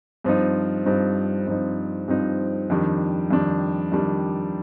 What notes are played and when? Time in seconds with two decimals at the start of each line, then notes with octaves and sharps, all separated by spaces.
0.24 G2 F3 C4 D#4
0.86 G2 F3 C4 D#4
1.47 G2 F3 C4 D#4
2.08 G2 F3 C4 D#4
2.70 F2 D#3 G3 D4
3.31 F2 D#3 G3 D4
3.92 F2 D#3 G3 D4